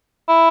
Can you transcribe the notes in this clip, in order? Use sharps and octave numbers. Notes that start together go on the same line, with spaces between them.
E4